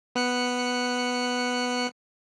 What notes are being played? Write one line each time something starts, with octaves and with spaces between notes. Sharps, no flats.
B3 F#6 C#7